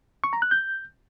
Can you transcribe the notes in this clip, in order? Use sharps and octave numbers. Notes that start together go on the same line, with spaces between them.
C#6
A#5
F#6
G6